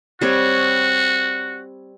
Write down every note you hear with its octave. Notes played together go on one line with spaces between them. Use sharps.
G3 C4 F#4 C#5